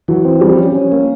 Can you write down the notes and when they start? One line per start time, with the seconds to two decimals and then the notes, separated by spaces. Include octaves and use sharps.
0.08 E3 F#3
0.25 C4
0.41 F3 G3
0.59 C#4
0.75 C#4
0.92 A#3